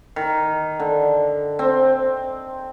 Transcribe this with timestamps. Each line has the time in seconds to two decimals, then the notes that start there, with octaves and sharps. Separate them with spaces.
0.16 D#3
0.80 D3
1.59 C4